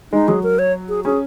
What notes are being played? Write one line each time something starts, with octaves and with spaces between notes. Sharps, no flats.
G#3 D#4
F#3 G#4
A#4
C#5
G#4
C#4 G#4